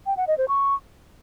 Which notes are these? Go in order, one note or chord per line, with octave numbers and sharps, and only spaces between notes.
G5
F#5
D#5
C5
C#6